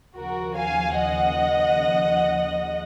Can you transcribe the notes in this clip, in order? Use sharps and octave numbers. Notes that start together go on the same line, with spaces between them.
D#2 C#3 F3 F#4 A#4
F5 G#5
D#5 F#5